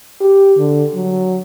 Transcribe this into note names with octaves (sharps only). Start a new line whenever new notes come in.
G4
D3
F#3